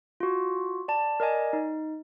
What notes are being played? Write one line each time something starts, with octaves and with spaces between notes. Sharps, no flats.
F4 F#4
D5 A5
A#4 D5 D#5 G#5
D#4